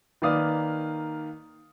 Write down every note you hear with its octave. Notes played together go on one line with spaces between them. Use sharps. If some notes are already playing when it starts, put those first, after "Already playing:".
D#3 A#3 B4 D5 F5 D#6